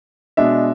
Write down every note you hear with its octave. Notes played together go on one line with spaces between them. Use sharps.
B2 G#3 D4 E5